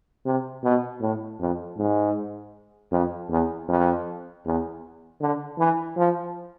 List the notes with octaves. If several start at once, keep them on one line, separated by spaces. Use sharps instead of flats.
C3
B2
A2
F2
G#2
F2
E2
F2
E2
D3
E3
F3